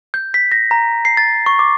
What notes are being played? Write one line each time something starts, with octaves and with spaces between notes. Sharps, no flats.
G6
B6
A#6
A#5
C7
A6
C#6
D6